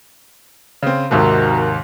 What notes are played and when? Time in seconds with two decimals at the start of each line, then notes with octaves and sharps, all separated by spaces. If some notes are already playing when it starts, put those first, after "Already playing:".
0.83 C#3 C4
1.11 D#2 G#2 C3 D#3 F#4 A#4